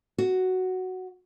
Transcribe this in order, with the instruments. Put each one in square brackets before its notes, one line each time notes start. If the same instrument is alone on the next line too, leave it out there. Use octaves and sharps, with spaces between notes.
[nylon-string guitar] F#4